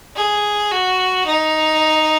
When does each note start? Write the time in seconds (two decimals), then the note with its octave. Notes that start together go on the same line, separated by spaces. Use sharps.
0.16 G#4
0.71 F#4
1.26 D#4